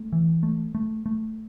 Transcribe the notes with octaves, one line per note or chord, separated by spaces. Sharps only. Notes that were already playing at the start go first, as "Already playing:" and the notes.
Already playing: A3
E3
A3
A3
A3